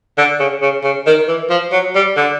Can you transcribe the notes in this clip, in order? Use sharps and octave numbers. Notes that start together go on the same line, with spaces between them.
D3
C#3
C#3
C#3
D#3
E3
F3
F#3
G3
D3